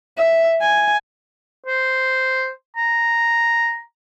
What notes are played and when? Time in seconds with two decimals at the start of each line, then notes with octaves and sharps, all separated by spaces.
0.17 E5
0.61 G#5
1.66 C5
2.77 A#5